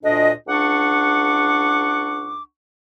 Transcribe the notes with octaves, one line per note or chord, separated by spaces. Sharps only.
D2 A#2 D4 D#5
C#2 D4 F#5 C#6 D6